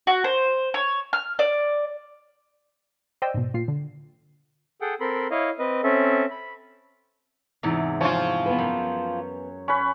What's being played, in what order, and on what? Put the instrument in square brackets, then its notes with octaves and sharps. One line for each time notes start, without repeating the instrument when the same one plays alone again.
[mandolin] F#4
C5
C#5
F6
D5
[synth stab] C5 D5 D#5 G5 E6
G#2 B2
A#2 F4 C7
D3
[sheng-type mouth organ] G#4 A4 F#5 G5
C4 A4 A#4 B5 C6
E4 C#5 D#5 F5
C4 B4 D#5
C4 C#4 A4 E5
B5
[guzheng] E2 G#2 C3
[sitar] F3 F4 [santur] C#5 G#5
[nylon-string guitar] B3 B4
[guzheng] F#2
[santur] C#4 B4